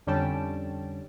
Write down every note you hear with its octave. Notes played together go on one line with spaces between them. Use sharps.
F2 D3 G3 C#4 G5 A5